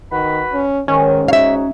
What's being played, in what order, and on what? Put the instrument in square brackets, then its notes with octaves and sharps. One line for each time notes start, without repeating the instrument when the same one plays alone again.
[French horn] D#3 [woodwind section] F#4 B4 B5
[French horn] C#4
[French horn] G#2 [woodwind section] D#3 [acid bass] C#4
[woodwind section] D#4 F#4 C#5 [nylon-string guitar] E5 F5